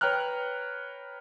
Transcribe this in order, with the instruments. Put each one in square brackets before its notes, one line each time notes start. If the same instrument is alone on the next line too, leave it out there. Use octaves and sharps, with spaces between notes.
[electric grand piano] B4 C#5 G5 A#5 F6 F#6